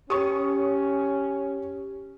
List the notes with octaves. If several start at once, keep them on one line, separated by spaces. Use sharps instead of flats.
C#4 G4 C#5 C#6 D#6